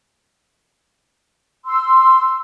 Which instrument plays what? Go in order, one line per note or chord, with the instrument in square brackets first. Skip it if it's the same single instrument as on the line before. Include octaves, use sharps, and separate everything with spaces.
[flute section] C6 E6